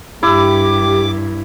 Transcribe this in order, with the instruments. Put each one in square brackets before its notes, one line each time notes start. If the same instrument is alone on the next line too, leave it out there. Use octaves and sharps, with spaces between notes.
[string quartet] G2 [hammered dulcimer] E4 [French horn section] G4 [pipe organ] D6